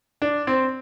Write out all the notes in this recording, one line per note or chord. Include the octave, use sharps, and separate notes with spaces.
D4
C4